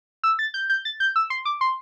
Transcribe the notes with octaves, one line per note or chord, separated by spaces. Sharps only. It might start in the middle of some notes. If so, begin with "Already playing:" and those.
E6
A6
G6
G6
A6
G6
E6
C6
D6
C6